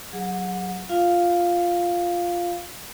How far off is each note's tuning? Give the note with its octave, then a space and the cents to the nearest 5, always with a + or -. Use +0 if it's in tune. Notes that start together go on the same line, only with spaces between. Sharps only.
F#3 +5 G#4 -15 F#5 -30
F4 +0 F5 +0